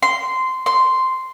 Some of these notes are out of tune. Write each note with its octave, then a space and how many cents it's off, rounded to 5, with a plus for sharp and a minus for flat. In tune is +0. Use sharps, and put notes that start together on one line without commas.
C6 -15
C6 -5